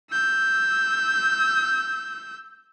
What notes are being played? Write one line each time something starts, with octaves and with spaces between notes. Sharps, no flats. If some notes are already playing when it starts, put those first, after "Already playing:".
E6 G6